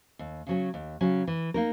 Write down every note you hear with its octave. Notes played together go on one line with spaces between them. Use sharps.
D#2
C#3 F#3 C#4
D#2
C#3 F#3 C#4
E3
A#3 D#4 A#4